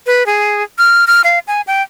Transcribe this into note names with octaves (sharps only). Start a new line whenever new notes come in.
B4
G#4
F6
F6
F5
G#5
G5